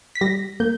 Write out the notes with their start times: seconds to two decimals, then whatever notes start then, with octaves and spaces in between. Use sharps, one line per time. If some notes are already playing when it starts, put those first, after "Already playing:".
0.15 B6
0.21 G3 A#6
0.60 A#3 G6